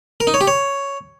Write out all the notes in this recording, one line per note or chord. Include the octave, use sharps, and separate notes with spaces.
A#4
D#4
C#5
G4
C#5